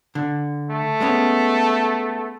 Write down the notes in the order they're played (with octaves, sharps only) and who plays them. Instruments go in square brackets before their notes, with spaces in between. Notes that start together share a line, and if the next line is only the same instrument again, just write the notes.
[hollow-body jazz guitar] D3
[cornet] A3
[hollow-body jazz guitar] G#3 B3 C#4